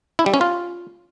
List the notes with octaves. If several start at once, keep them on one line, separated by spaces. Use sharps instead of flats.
E4
G3
C#4
F4